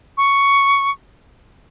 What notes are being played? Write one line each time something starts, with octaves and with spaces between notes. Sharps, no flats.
C#6